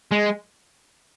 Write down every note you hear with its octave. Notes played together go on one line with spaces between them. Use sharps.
G#3